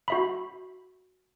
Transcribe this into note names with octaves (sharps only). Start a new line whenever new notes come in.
F#4 E5 B5